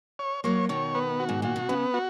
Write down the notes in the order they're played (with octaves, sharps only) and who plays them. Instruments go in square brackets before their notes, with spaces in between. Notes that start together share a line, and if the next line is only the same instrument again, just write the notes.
[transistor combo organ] C#5
[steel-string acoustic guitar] F#3 A#3 [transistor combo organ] C#5
[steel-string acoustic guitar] B2 D#3 [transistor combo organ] C#5
[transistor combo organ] B3
F#4
[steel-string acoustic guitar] G#2
[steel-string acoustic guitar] A#2 [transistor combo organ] F#4
[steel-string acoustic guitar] B2
[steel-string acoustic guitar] C#3 [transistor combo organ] B3
[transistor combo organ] F#4